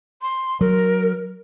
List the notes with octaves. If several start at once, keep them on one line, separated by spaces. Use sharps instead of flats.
C6
F#3 A#4